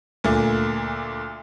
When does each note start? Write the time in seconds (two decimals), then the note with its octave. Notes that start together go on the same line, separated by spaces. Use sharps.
0.24 D2 A#2 A3